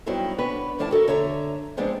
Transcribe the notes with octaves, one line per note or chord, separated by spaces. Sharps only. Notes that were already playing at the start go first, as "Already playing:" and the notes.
G2 F#3 B3 C4 D#4 E4
B3 C#4 D4 B4
A2 F3 D4 E4 F5 A5
F#4 A4 A#4 E5
D3 C#5 E5 A#5
C3 F3 G#3 B3 C4 D4